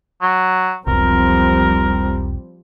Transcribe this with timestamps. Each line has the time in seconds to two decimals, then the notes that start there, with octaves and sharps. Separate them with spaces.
0.22 F#3
0.87 E1 B1 F3 G3 C4 A#4